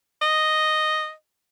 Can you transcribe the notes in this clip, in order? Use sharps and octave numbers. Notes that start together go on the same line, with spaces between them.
D#5